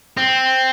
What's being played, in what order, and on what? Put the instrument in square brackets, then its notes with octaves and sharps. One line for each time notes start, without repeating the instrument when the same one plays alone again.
[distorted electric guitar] C4